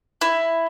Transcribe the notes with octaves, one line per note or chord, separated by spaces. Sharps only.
E4